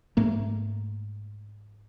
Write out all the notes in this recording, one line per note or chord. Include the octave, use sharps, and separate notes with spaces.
G#2 A3 A#3